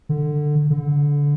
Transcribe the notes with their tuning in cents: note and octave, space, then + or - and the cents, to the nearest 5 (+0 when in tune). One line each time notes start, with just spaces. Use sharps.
D3 +15
D3 -20